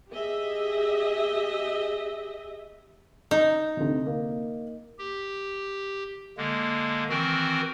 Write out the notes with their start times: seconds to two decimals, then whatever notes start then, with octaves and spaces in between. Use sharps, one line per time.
0.11 G4 G#4 D#5 E5
3.31 D#4
3.77 D2 C3
4.06 A#3
4.98 G4
6.37 D3 G#3 A#3
7.09 D#3 E3 C4 F#4 A#4